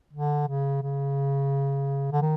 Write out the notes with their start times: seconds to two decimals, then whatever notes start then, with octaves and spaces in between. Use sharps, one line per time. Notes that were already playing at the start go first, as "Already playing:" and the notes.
0.13 D3
0.48 C#3
0.82 C#3
2.12 D3
2.22 D#3